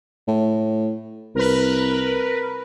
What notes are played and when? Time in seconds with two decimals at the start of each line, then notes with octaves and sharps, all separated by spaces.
0.27 A2
1.35 C2 A#4 B4